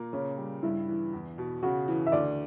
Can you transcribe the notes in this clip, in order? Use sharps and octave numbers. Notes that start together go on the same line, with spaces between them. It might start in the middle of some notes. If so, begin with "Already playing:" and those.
Already playing: A#2 A#3
C#3 C#4
G3
G2 E4
E3
E2
B2
C#3 F#4
E3
E5
D2 D5